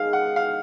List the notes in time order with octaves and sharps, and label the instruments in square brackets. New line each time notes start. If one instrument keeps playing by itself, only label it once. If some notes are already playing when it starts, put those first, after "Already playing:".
Already playing: [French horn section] D#3 G#3 D#4 G#4 [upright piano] F5
[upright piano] F#5
F5